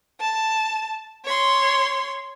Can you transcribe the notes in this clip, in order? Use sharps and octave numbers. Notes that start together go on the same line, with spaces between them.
A5
C#5 C6